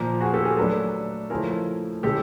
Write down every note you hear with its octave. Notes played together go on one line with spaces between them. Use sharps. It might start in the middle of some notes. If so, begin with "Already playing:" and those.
Already playing: A#2 F3 A#3 A#4
F#4 G#4
G4 A4
G#4 A#4
F#3 A3 D4 A4 B4
C#3 F3 A3 C#4 E4 G#4 A#4
B2 G#3 C#4 E4 G4 A4